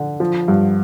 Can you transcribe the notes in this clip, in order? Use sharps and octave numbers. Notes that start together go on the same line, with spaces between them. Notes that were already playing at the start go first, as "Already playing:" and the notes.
Already playing: D3
F3
G2